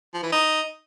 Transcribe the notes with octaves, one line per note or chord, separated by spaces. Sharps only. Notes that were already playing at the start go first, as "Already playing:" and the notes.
F3
E3
D#4